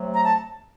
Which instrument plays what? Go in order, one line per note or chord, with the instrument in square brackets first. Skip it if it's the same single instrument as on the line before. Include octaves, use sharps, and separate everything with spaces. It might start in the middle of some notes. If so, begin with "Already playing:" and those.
Already playing: [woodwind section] C3 F#3 A3
A#5
A5